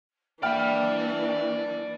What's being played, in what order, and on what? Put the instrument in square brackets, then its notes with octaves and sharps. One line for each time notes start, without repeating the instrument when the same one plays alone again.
[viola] E3 D4 [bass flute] A#3 [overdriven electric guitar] D5 B5 [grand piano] E5 G5 F6